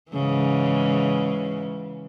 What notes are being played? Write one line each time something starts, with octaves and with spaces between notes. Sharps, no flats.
G#2 C#3 E3